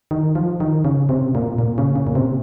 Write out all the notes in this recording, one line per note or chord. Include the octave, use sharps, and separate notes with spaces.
D#3
F3
D#3
C#3
C3
A#2
A#2
C#3
C#3
A#2
C3